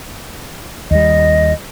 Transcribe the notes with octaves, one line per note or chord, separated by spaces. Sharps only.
D#2 G3 D#5